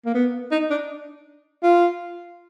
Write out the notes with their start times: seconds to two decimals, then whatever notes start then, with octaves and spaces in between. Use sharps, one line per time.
0.05 A#3
0.14 B3
0.52 D#4
0.70 D4
1.63 F4